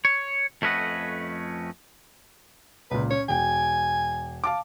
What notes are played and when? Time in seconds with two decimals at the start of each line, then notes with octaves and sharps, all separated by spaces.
0.05 C#5
0.62 F2 A3 C#4 B4 D#5 F#5
2.91 C#2 A#2 B4
3.10 C#4 C#5
3.29 E1 G5 G#5
4.44 F5 A5 D6